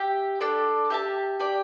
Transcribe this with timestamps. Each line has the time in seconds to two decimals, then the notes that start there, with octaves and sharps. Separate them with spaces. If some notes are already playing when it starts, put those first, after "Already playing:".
Already playing: G4 E5 G5
0.40 D4 A4 D5
0.90 G4 E5 A5
1.40 G4 D5 G5